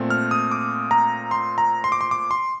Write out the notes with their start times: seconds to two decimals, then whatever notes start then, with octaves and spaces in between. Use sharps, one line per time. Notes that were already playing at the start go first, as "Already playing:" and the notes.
Already playing: A#2 A3 C4
0.10 F6
0.31 D#6
0.51 D6
0.91 A#5
1.31 C6
1.58 A#5
1.84 C6
1.92 D6
2.01 C6
2.11 D6
2.31 C6